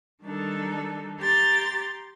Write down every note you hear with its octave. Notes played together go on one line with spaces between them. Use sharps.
D#3 G3 D4 D#4 A4
G4 A#5 C6 A6